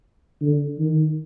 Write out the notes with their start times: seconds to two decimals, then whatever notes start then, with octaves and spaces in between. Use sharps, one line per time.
0.42 D3
0.79 D#3